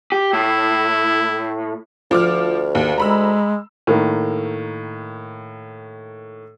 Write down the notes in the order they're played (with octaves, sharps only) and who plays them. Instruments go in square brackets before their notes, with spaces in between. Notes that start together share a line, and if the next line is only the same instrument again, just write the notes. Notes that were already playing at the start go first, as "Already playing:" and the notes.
[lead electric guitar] G4
[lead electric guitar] A2 [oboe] E4
[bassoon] D2 [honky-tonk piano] F3 D6 F6
[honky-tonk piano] D#2
[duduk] G#3 [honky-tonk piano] A#5 B5 E6
[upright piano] A2 D#3 A#3